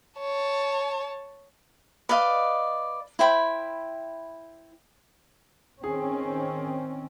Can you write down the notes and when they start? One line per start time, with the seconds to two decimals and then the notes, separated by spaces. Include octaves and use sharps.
0.18 C#5 A5
2.09 B4 D5 D#5 F5
3.19 E4 C5 G5 B5
5.84 D#3 C4 C#4 G#4